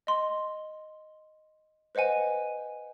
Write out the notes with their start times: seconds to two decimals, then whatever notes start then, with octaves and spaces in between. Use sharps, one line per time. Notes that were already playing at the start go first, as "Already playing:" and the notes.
0.07 D#5 C6
1.95 B4 C5 D#5 F#5 G#5